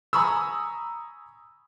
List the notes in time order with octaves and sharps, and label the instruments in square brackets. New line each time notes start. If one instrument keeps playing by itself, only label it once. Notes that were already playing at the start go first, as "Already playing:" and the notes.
[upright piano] G#5 A#5 B5 C#6 D#6 E6